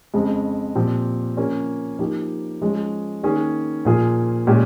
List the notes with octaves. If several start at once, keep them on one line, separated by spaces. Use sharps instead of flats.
F2 C#3 G#3
A#2 F3 C4 G4
C#3 F3 A#3 C#4
F3 A#3 D#4 G4
F3 G#3 C#4 G#4
D#3 A#3 C#4 G#4
A#2 F3 A#3 F4 G#4
A#2 G#3 C#4 G4